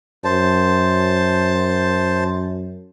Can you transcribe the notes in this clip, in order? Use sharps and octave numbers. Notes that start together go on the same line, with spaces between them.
F#2 C5 A5